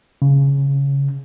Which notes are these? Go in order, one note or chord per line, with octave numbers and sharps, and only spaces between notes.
C#3